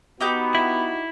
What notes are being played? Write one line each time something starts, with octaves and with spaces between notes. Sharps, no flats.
B3 D#4 F#4 G4 G6
E4